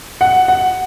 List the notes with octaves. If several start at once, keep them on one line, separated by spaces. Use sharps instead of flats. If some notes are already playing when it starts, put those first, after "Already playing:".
F#5
F#5